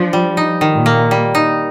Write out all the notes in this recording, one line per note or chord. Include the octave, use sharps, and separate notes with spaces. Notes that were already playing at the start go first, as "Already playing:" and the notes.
Already playing: F3 D4
G3
D#4
D#3
A#2
A#3
G3
D#4